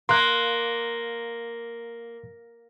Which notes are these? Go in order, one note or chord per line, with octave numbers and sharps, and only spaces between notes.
A#3 C6 F#6